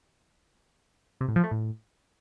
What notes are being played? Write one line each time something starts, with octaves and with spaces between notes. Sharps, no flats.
C3
A2
F3
A3
A2